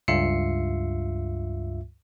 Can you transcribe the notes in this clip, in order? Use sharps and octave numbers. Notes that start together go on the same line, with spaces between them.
C#2 G2 F4 E5 C7 C#7